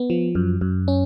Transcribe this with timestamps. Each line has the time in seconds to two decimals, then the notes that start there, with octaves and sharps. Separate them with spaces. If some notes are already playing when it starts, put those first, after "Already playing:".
Already playing: B3
0.10 F3
0.35 F#2
0.61 F#2
0.88 C#4